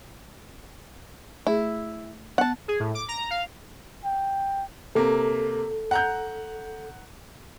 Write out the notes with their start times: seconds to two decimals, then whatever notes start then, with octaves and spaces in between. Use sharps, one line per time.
1.47 A3 E4 G#4
2.38 B3 F#5 A5
2.68 G#4
2.80 A2
2.95 D6
3.08 A#5
3.30 F5
4.05 G5
4.95 C3 A#3 A4
5.91 F#5 A#5 G6